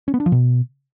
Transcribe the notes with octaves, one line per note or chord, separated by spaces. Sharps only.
C#4
B3
D4
F3
B2